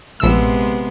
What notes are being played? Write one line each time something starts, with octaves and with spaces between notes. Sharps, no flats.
A#1 C3 G#3 B3 E6